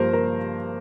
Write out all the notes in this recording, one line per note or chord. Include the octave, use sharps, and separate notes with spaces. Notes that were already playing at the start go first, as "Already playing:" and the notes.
Already playing: G2 F3 A#3 A#4 C5
A#4